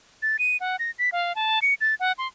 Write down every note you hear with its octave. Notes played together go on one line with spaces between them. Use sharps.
A6
D#7
F#5
A#6
B6
F5
A5
C#7
A6
F#5
C6